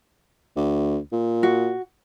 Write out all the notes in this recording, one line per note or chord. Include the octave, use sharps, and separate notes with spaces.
D2
A#2
F#4